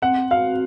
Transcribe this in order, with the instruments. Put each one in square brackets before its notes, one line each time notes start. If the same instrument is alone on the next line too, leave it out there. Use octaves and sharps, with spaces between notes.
[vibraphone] C4 [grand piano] F#5
[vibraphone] F#4 [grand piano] F5